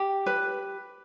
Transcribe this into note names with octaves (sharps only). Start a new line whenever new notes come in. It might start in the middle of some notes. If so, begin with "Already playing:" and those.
Already playing: G4
B4